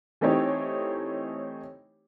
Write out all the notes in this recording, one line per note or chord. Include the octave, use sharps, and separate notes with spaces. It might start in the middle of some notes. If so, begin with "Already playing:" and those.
E3 A3 C4 D#4 G4 C#5